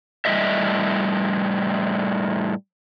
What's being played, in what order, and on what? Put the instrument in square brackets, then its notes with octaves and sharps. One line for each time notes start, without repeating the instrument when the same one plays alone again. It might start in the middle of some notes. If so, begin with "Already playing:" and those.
[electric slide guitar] A2 G3 A3 F#4 D#5 E5